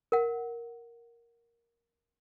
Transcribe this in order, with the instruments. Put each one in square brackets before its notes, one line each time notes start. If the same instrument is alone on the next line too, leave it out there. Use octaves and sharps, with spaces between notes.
[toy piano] A#4 F#5